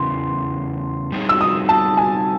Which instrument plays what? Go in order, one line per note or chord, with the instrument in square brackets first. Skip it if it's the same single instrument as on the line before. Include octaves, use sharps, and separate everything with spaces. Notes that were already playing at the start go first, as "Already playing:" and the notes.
Already playing: [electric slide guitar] E2 C#3 E3 [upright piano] C6
[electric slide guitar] G3 C4 D#4 G#4 C#5
[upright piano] E6
D#6
A5
G#5